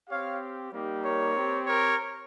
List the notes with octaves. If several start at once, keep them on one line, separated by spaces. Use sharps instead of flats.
C4 G4 C#5 F5
G3 A#3 D#4 G4
A#4 C#5
C4 G4
A#4 C#5